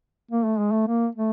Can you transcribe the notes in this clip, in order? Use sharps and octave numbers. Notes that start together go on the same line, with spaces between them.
A#3
A3
G#3
A3
A#3
A3